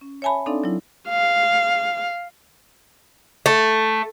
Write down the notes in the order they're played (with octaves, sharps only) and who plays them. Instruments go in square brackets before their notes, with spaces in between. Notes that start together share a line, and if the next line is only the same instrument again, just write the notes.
[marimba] C#4
C#5 E5 G#5 A5 B5
C4 D4 D#4 A4 D5 F5
F#3 E4
[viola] F5
[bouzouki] A3